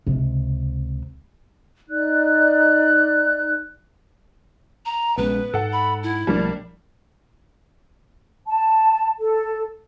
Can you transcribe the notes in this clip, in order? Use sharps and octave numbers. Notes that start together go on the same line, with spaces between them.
C#2 C3
D#4 D5 F#6
A#5
A#1 G#3 B3 C#4 B4
G#2 A4 F#5
B5
E4
B1 F3 G3 A3 A#3 D4
A5
A4